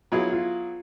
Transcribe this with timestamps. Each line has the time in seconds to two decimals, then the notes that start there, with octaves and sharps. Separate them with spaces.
0.12 F#3 B3 E4 F4 G#4
0.33 F4